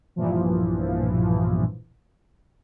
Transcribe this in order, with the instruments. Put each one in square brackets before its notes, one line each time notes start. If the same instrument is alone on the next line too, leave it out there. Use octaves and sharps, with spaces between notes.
[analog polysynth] B1 G2 A#2 E3 F3